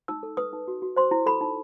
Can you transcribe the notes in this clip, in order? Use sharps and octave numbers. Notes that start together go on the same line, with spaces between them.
D#4 E6
A4
B4 D#6
D#4
F#4
F#4
C5 C6
E4
A4 B5
D#4